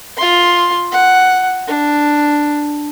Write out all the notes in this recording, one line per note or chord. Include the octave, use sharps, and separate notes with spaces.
F4 C6
F#5
D4